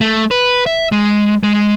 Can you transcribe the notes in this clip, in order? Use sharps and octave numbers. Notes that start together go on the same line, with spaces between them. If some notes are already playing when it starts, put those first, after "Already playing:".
A3
B4
E5
G#3
G#3